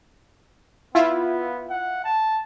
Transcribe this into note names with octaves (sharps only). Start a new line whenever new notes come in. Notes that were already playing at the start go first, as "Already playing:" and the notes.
B3 E4 F4
F#5
A5